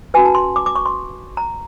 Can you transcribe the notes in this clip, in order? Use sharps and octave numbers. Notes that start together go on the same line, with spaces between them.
C#4 F#4 B4 G#5
A5
C6
D6
D6
C#6
C6
A#5